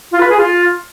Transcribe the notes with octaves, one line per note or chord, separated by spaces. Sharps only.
F4
B4
G#4
F4